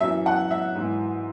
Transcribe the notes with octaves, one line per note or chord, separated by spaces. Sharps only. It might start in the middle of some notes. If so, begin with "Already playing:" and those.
F#2 E3 E5
F#5
E5
G#2 E3